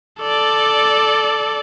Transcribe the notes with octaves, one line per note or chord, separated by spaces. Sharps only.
A4 D5